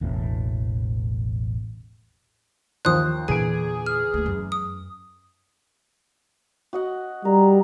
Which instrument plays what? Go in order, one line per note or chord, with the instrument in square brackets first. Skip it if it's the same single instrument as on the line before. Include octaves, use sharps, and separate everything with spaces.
[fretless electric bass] E1 A1 E2 A2
[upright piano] D#2 F3 C5 [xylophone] D#6 F#6
[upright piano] E2 D7 [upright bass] A#2 D3 [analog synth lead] G#4 [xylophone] G#5
[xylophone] F6
[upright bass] D2 A#3
F#2
[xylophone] D#6
[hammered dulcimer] F#4 D#5 F#5
[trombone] G3 [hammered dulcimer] A#4